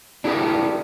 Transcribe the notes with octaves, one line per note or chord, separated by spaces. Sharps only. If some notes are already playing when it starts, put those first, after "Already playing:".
D4 E4 G4 G#4 A#4